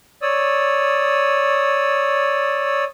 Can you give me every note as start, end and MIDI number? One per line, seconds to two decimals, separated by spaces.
0.22 2.84 73
0.22 2.84 74
0.22 2.84 87
0.22 2.84 88